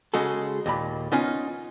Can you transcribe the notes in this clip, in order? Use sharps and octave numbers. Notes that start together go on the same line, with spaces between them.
C#3 G#3 F#4 A4
D#2 A#2 B5
B3 C#4 D#4 F4